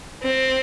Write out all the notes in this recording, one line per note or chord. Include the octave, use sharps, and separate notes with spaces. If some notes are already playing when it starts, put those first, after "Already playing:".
C4